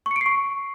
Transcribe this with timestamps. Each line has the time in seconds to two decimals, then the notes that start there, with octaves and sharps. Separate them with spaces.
0.06 C#6
0.11 C#7
0.16 D7
0.21 C7
0.26 C#6